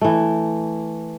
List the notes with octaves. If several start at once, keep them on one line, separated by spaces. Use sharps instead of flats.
E3 A3